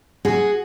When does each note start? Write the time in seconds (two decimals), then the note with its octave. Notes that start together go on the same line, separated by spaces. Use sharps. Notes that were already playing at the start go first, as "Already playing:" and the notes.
0.25 F#4 G#4